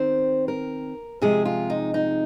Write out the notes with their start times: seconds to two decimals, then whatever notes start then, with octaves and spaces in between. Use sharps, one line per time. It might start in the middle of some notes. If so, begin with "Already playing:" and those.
Already playing: D#3 C4 C5
0.48 A#4
1.22 C3 F3 G#3 G#4
1.45 F4
1.70 D#4
1.94 D#4